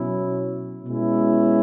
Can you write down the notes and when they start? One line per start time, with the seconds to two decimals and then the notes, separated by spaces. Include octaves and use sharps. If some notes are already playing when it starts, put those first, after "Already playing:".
Already playing: B2 F#3 C#4 E4
0.85 B2 G#3 C#4 E4